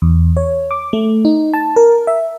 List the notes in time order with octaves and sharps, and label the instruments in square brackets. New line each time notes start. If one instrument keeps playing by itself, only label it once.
[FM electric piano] E2
C#5
D6
A3
D#4
A5
A#4
E5